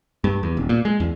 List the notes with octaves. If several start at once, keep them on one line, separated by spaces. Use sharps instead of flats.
G2
E2
D#1
A#2
G#3
E2